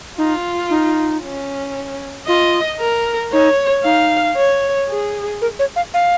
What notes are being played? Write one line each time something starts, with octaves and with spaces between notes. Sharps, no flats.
D#4 F4
D#4
C#4
F4 D#5
A#4
D#4 C#5
D#4 F5
C#5
G#4
A#4
C#5
F5
F5